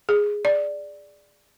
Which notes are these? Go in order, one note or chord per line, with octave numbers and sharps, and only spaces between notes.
G#4
D5